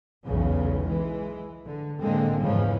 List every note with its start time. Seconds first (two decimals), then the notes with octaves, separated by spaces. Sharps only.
0.25 B1 E2 C#3
0.83 E3 G#3
1.65 D3
1.99 A2 D3 G#3 A#3 C4
2.41 E2 G#2 C#3 E3 F3